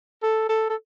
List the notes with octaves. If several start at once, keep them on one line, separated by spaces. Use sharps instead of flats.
A4
A4
A4